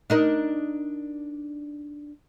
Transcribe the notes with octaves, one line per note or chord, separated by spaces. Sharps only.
D4 D#4 A#4